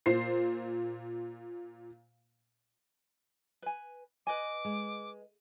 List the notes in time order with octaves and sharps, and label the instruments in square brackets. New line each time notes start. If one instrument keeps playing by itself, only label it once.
[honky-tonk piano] A#2 C5 C7
[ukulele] B4 G#5
[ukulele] B4 D#5 G#5 [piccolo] D6
[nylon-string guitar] G#3